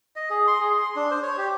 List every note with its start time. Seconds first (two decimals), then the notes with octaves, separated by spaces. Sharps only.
0.16 D#5
0.30 G#4
0.47 C6
0.60 G#4
0.78 C6
0.96 D4
1.11 C5
1.23 C#5
1.38 G4